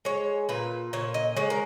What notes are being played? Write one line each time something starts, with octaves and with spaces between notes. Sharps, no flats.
G#3 C#5
A#2 B4
A#2 C#5
D#5
G#3 C#5
A#4